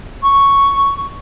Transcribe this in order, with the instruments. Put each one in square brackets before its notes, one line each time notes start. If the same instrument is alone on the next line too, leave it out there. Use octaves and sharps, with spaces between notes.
[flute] C#6